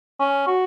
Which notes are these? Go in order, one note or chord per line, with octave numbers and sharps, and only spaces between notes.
C#4
F#4